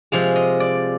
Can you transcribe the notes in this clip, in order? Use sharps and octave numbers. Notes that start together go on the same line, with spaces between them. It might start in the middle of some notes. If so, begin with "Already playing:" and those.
C3 F3 G#3 F5
D#5
D5